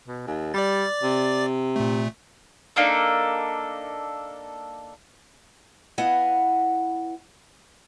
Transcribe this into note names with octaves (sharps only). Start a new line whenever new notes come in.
B2
D#2
G3 D5 D6 A6
C3
A#2 A3
A#3 D4 D#4 A4
B3 E4 D#5 F5 F#5 G#5